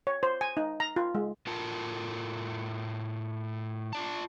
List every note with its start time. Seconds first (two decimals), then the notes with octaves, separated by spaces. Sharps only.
0.07 C#5
0.23 C5
0.41 G#5
0.57 D#4
0.80 A#5
0.96 F4
1.15 G#3
1.47 A2 A3 F4 A#4 A5
3.93 F4 D5 A5